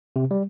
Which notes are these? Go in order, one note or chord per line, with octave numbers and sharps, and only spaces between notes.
C3
G3